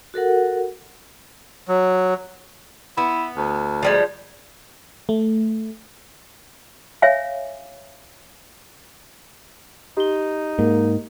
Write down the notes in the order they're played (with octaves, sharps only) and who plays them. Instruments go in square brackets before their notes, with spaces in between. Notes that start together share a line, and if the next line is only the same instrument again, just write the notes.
[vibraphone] F#4 A4 A#4 F#5
[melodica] F#3
[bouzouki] B3 [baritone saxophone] E4
[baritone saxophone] D2
[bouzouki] F3 G3 G#3
[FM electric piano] A3
[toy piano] C#5 E5 F5 G#5
[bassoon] D#4 [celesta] G4 G7
[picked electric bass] G#2 [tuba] A#3